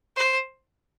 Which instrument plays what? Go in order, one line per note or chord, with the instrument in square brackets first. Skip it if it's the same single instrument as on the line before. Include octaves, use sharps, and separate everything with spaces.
[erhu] C5